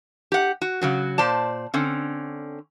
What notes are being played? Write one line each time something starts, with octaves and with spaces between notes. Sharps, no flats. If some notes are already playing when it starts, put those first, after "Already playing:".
G4 F#5
F#4
C#3 F#3 F#4
A#2 C5 D5 A5
D3 C4 C#4